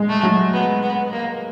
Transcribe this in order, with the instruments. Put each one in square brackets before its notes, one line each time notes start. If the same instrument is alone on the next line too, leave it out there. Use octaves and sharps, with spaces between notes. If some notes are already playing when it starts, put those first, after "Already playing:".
Already playing: [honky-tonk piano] G#3
[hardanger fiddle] A3
[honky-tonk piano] F#3
[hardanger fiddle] B3
B3
A#3